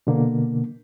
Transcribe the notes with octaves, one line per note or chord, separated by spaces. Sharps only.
B2 D3 A#3